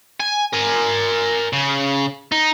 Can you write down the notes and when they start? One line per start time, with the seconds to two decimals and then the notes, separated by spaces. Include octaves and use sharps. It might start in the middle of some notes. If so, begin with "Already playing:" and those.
0.20 G#5
0.53 A#4 G#5
1.53 C#3
2.32 D#4